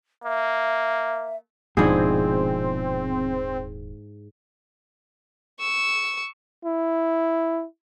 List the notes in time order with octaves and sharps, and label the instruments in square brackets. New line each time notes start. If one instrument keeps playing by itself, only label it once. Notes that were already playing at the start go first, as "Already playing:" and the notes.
[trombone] A#3 [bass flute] E5
[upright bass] D#1 [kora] G#2 E4 G#4 [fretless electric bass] B2 F3 D4 [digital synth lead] C4
[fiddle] C#6 E6
[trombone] E4